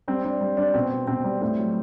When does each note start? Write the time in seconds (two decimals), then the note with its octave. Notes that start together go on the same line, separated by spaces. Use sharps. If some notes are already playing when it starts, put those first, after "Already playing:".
0.08 G3 C4
0.24 G3 D4
0.41 G3
0.57 G3 D4
0.74 B2 C4
0.91 B2
1.07 B2 C4
1.24 G3
1.41 A2 C4
1.59 F#3